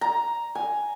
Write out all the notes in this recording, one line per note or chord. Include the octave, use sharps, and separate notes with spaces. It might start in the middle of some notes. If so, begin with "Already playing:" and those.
A#5
G#5